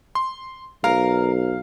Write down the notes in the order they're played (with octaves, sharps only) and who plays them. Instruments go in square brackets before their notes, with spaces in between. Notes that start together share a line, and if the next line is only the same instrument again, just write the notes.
[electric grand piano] C6
[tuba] B1 [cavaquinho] A#4 [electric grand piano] F5